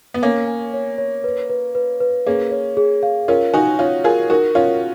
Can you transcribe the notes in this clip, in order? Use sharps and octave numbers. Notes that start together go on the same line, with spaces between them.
B3
A#3 C#4 G#5
G#5
C#5
C#5
B4
B4
B4
B4
A#3 C#4 G#4
C#5
G#4
F5
C#4 F4 A#4
D#4 F#4 G#5
C#4 F4 C#5
F4 G#4 A#4
D#4 F#4 A#4
C#4 F4 F5